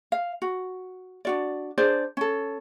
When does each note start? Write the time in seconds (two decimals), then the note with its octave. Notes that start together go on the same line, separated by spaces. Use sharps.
0.12 F5
0.42 F#4
1.25 D4 F#4 D5
1.78 D4 G#4 C5 D5
2.17 C#4 A4